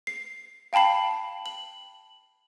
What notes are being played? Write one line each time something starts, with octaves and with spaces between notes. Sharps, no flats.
C7
F5 G5 A5 B5 C7
F#7